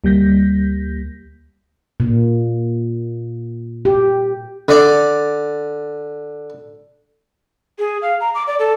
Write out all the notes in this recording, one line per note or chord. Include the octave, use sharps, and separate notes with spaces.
D2 G3 A#3 G6 A#6 B6
A#2
G4
D3 D5
G#4
F5
A#5
D6
D5
A4